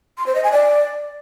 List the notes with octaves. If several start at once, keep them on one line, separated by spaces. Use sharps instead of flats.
C6
C5
D#5
G#5
D5